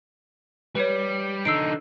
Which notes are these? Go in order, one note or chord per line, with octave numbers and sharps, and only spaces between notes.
G3 B4 C#5
D3 D#4 E6 C7 D7